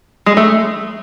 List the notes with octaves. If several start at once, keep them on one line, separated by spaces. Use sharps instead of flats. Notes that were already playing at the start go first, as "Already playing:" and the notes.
G#3
A3